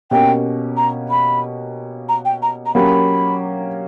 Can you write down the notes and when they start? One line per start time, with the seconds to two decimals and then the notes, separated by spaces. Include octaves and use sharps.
0.11 B2 A#3 C#4 G4 G5
0.77 A#5
1.10 B5
2.09 A#5
2.25 G5
2.42 A#5
2.66 A#5
2.75 F#3 A#3 C#4 G4 B5